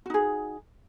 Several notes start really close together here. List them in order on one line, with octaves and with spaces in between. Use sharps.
F#4 D#4 G#4